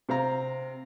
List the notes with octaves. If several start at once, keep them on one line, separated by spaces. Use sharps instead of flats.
C3 C4 F5 A#5